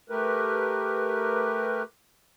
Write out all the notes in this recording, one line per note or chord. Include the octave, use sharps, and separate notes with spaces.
A3 G4 A#4 B4